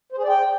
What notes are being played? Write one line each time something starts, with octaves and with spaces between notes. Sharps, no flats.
C5
G#4
D5
G5